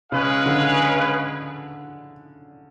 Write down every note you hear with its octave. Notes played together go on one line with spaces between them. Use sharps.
C#3 G#3 C#4 G#4 B4 F5
D3